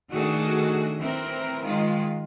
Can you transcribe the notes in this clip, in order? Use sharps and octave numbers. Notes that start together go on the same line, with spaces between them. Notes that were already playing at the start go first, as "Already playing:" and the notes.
D#3 A3 D4 F#4 G#4 A4
E3 C4 A#4
D#3 G#3 F4